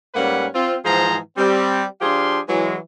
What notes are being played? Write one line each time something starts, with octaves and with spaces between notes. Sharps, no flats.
G#2 G3 A#3 C#4 B4 F#5
C4 F4
G#2 E3 F3 G#4 C5 A#5
G3 C4
F3 D4 G4 G#4 F5 C6
E3 F#3 G#3